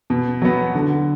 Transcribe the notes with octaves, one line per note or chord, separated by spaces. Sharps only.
B2
F#3 B3
D3